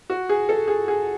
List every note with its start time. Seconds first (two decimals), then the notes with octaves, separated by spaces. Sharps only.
0.10 F#4
0.29 G#4
0.49 A4
0.68 G#4
0.88 G#4